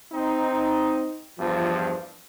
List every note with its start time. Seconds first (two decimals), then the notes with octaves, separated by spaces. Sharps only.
0.13 C4 D#4
1.39 E2 G2 F3